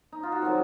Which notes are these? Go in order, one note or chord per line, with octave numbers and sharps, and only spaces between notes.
D#4
F4
F#4
C3 D#3 F#3 A4